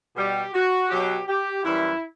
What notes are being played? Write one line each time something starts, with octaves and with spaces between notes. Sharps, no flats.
B2 G3 G4
F#4
B2 F#3 G4
G4
F#2 E3 G3 E4